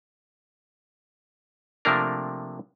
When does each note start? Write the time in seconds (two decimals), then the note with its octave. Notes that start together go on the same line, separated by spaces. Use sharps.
1.85 C3 F3 A3 A#3 D4 A#4